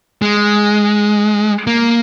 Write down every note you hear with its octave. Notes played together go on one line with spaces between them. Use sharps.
G#3
A#3